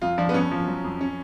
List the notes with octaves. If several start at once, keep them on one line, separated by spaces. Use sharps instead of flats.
F2 F4
F3 D4
B3
F2 C#4
F3
F#3
F2
C#4